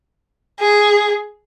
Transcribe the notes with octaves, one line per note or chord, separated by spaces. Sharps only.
G#4